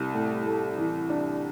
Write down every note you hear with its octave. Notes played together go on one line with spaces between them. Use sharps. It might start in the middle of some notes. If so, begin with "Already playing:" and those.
Already playing: C2
A2
A3
E3
D4